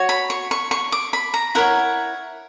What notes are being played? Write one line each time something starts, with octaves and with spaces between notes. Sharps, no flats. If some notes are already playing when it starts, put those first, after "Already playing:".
Already playing: F#4 C#5
B5
C#6
C#6
C#6
D6
B5
A#5
E4 A#4 C#5 F#5